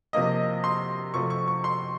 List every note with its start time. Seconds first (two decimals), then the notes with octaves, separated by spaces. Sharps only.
0.13 C3 F3 A#3 D#5
0.64 C6
1.14 C3 F3 A3 C#6
1.30 C#6
1.48 C#6
1.64 C6